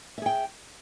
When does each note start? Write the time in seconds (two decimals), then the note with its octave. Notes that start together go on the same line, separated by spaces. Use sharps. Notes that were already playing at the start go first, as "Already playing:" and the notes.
0.18 E5
0.22 G#4
0.26 G5